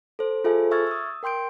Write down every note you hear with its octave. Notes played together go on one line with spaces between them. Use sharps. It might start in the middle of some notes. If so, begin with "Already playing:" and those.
A4 C5
F4 G#4 A4 C5 E5 G#5
E5 C#6 E6 F6 G#6 A6
D#6 E6
A#4 G5 C6 G6 D7